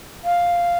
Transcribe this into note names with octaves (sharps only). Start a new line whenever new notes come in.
F5